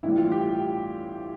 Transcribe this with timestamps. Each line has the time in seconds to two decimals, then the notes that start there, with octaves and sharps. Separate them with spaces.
0.03 A1 A2 E3 G3 E4
0.17 F4
0.32 G4